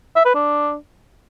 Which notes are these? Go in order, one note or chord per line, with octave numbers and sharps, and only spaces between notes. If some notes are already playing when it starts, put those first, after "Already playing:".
E5
B4
D4